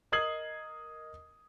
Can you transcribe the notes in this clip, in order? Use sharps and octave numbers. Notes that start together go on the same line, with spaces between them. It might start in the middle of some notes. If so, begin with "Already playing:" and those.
A#4 D#5 D#6 G#6 C7 F#7